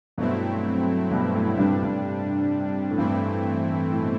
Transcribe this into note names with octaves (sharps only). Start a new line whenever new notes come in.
G2 B2 F#3 A3 C4 E4
G2 B2
A2
G2 C3 G3 D4
A2
G2
A2
G2 E3 A3 C4 E4
A2
A2
B2